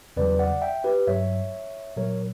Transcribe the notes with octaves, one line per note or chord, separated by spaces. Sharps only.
E2 C#3 F#3 B4 D5
D5 F#5
E5 G5
G4 B4
G2 F#3 C#5 E5
A#2 F#3 A#4 C#5